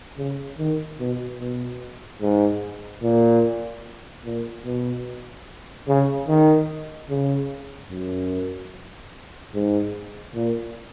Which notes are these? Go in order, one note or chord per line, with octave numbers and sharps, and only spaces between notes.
C#3
D#3
B2
B2
G#2
A#2
A#2
B2
C#3
D#3
C#3
F#2
G#2
A#2